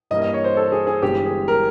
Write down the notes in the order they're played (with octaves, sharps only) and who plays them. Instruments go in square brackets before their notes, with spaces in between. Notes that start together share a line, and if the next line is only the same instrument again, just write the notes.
[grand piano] G2 E3 G3 A#3 D#5
D#5
C#5
C5
A4
G#4
G#4
G1 G2 E3 G#3 B3 G4
G#4
A#4